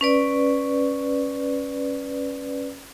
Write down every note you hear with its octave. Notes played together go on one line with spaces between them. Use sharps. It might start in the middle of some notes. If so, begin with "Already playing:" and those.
C#4 B4 D5